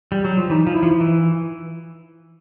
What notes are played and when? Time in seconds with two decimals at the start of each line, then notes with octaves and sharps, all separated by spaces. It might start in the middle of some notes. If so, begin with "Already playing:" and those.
0.12 G3
0.25 F#3
0.37 F3
0.50 E3 D#4
0.67 F3
0.75 E4
0.83 F3
1.00 E3